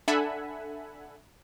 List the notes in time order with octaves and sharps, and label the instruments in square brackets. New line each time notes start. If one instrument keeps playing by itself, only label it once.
[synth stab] D4 A4 E5 F#5 G#5 B5